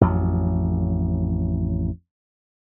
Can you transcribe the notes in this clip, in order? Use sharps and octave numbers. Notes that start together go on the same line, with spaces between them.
A1 F2 F#3